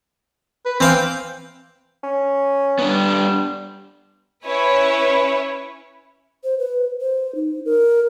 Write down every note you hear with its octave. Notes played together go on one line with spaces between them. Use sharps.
B4
E3 C4 F5 G5
C#4
G3 B3 D4
C#4 E4 B4 C#5
C5
B4
C5
D#4
A#4